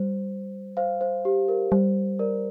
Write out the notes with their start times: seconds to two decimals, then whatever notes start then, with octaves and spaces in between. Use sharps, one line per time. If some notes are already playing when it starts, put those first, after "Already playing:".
Already playing: G3 C5
0.77 C5 F5
1.01 C5
1.25 G4
1.48 A#4
1.72 G3 C5
2.19 A#4 D5